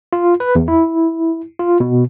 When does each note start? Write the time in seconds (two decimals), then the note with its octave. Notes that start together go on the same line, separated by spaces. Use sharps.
0.13 F4
0.40 B4
0.55 E2
0.68 E4
1.59 F4
1.80 B2